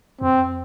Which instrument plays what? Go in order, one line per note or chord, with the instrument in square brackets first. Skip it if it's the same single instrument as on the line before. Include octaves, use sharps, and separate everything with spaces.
[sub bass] F2 [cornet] C4